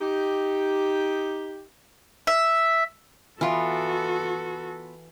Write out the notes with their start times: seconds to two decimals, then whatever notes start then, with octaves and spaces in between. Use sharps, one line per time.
0.01 D#4 G4
2.27 E5
3.41 E3 B3 F4 F#4 A4